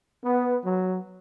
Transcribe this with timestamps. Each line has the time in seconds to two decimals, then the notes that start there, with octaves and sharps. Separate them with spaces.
0.23 B3
0.65 F#3